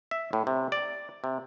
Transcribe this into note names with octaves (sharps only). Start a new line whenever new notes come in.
E5
A2
C3
D5
C3